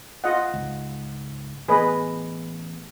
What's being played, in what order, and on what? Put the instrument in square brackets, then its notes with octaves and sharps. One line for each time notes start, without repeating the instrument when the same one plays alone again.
[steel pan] F4 D#5 F#5
[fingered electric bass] C#2 G#2
[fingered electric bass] A1 B3 [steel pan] G#4 B4 D#5